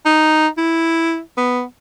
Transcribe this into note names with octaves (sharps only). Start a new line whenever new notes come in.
D#4
E4
B3